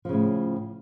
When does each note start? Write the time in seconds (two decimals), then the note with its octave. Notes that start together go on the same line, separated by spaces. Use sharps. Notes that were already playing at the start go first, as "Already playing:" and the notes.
0.05 F3
0.09 C#3
0.13 A2